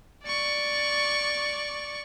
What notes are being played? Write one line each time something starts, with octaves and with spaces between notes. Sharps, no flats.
D5 C#6